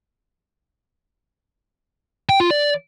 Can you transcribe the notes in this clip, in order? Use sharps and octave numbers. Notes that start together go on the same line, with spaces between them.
G5
F4
D5